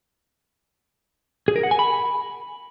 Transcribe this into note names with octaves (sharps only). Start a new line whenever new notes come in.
G#4
A#4
F#5
G#5
B5